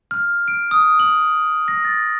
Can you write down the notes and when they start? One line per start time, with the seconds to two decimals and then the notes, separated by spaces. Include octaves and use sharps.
0.11 F6
0.48 D7
0.71 D#6
0.99 F#7
1.68 A#6
1.85 A6